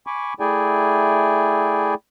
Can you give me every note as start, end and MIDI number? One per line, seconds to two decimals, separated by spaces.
0.07 0.34 80
0.07 0.34 83
0.07 0.34 85
0.07 0.34 86
0.40 1.94 57
0.40 1.94 64
0.40 1.94 68
0.40 1.94 74
0.40 1.94 79
0.40 1.94 80